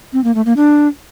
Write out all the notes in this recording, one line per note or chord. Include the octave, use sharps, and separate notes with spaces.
C4
A#3
A3
A#3
D4